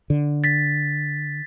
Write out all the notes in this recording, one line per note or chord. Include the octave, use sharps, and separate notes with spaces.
D3
A6 B6